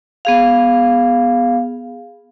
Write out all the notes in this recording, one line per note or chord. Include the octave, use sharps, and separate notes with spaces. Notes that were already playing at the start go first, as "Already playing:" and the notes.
B3 G#4 F5